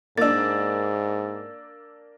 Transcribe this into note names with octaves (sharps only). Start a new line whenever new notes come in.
G#2 A#3 D4 E6 A6